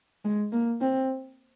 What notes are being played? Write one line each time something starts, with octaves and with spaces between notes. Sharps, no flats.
G#3
A#3
C4